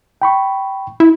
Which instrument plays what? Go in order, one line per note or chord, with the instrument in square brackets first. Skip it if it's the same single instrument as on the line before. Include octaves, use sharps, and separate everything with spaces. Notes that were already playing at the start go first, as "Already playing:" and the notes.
[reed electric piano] G5 B5 C#6
[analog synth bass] E4